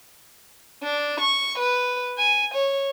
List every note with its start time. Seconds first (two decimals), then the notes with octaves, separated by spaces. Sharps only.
0.84 D4
1.20 C#6
1.59 B4
2.18 G#5
2.54 C#5